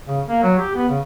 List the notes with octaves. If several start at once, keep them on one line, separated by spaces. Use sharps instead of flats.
C#3
A#3
F#3
G4
B3
C#3